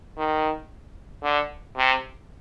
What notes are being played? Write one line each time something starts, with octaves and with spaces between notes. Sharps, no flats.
D#3
D3
C3